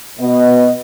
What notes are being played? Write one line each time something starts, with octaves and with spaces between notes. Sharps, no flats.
B2 B3 D#5